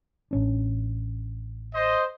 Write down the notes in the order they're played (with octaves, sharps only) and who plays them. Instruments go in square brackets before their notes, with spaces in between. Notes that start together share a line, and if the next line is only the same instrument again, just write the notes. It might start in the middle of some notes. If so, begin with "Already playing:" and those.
[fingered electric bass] A1 C#4 D4
[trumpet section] C5 D#5